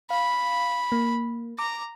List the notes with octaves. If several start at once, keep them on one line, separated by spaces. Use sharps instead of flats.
F5 B5
A#3
A#5 D6